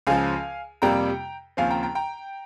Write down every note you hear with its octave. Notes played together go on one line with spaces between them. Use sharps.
C#2 C#3 F3 F5 G#5
F2 C3 G3 A#3 G5 A#5
D#2 C#3 F3 C4 F5 G#5
G5 A#5
G5 A#5
G5 A#5